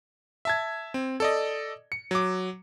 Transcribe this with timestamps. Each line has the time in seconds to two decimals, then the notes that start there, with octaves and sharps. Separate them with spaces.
0.45 E5 A5 G#6
0.94 C4
1.20 A4 D5 D#5
1.92 C#7
2.11 F#3 D6